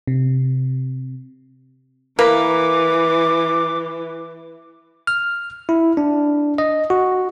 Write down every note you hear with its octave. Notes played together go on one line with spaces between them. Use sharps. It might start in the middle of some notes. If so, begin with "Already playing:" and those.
C3
E3 A#3 A#4 B4 D6
F6
E4
D4
D#5
F#4